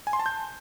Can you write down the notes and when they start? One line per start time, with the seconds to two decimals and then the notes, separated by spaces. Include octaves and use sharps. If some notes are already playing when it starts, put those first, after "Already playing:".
0.07 G#5
0.13 C6
0.19 A5
0.26 G6